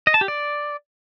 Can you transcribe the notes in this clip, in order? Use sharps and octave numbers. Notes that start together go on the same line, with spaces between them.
D#5
A5
G4
D5